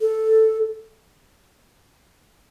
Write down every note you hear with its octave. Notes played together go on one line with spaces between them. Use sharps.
A4